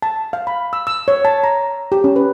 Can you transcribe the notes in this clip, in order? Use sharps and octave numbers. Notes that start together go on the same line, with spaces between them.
A5
F5
B5
E6
E6
C#5
A5
A#5
G4
C#4
B4